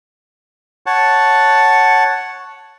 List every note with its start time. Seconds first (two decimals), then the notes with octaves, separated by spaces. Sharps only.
0.86 C#5 F#5 A5